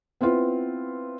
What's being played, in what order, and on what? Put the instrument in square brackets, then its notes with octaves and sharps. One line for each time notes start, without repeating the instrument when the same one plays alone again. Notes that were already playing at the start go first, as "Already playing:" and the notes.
[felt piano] B3 C4 E4 F4 B4